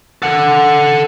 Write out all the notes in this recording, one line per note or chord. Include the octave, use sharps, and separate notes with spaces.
A4 F#5